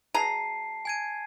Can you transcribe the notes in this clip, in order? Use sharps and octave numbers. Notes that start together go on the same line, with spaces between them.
B2 G#4 A5 A#5 C7
G#5 G#6 D#7